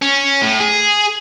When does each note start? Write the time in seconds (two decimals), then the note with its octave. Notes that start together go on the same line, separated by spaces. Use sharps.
0.02 C#4
0.42 A2
0.60 G#4